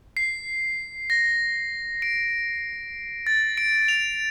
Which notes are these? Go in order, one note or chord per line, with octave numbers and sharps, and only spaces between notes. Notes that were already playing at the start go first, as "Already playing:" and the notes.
C7
A#6
D7
A6
D7
F7